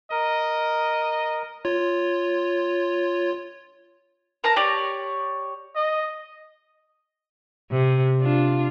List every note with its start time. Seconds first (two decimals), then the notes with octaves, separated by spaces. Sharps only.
0.11 A#4 D#5
1.65 F4 C#5
4.44 A#4 A5 A#5
4.56 G4 C#5 D5
5.76 D#5
7.71 C3
8.21 D4 F4